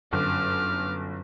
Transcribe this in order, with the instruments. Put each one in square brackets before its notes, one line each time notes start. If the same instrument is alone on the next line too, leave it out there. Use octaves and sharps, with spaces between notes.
[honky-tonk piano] G1 [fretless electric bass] F#2 [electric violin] D6 F6